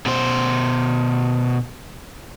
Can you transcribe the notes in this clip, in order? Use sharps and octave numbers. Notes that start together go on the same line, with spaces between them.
B2 C5